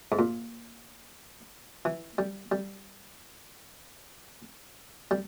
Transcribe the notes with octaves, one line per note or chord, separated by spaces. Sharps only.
G#2
A#2
E3
G3
G3
G3